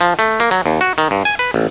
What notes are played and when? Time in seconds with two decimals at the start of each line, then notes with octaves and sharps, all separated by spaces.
0.01 F3
0.19 A3
0.40 A#3
0.51 F#3
0.66 D#2
0.81 F#4
0.98 D#3
1.11 G2
1.25 G#5
1.39 B4
1.54 A1